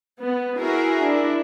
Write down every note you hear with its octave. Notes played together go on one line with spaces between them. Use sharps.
B3
E4 F#4 G#4 A#4 E5
D4 E4